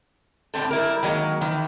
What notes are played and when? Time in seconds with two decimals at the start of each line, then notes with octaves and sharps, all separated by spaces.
0.54 A2 D3 A3 C4 A4
0.71 G3 E4 A#4
1.03 D#3 F#3 G#3 A#3
1.41 D#3 E3